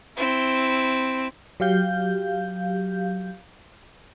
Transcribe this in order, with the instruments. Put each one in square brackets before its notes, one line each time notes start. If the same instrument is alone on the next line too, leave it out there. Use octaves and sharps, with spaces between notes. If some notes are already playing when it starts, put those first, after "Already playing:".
[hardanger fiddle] C4 E4
[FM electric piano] F#3 G4 F5 G6